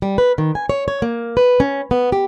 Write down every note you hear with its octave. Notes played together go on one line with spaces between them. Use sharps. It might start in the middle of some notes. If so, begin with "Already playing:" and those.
G3
B4
D#3
G#5
C#5
C#5
A#3
B4
C#4
B3
G4